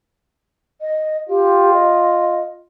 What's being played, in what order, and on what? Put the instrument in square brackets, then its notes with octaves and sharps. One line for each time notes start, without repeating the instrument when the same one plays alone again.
[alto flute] D#5
[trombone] F4 [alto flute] G4
[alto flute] D#5